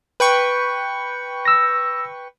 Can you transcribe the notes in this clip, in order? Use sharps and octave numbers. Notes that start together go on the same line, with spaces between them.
B4 G5 C#6
E6 A#6